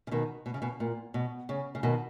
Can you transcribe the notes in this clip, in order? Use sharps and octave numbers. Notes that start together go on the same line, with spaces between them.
C#3
B2 D#3
B2
C#3
B2
A#2
B2
C#3
C#3
B2 D#3